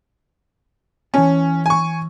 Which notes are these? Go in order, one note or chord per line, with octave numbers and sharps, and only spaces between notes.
E3 C#4 C#5 A5
G#5 C#6